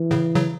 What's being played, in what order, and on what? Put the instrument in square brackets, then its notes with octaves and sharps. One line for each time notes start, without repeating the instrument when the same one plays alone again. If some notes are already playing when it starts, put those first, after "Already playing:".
Already playing: [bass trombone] E3
[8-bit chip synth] A2 C#3
C#3 F#3